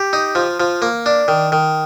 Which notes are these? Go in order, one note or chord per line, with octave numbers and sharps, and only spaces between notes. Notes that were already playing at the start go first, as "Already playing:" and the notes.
Already playing: G4
D#4
F3
F3
A#3
D4
D#3
D#3